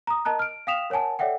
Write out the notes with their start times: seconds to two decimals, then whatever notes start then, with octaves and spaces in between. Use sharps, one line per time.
0.07 A#5 D#6
0.25 A#4 D#5 A5 A#5 F#6
0.39 F6 D7
0.67 F5 G5 D#6 B6 E7 F7
0.90 A#4 C#5 F#5 G#5 A5
1.19 A4 C#5 D5 E5 F#5 G5